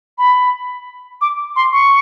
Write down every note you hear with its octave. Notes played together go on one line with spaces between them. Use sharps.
B5
D6
C6
C#6